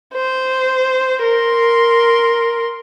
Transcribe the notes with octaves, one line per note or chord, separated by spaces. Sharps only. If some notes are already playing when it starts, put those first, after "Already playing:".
C5
A#4 C6